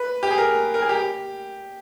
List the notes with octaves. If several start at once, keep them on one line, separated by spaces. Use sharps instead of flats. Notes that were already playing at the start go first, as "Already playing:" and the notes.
Already playing: B4
G4
G#4
A#4
A#4
G#4
G4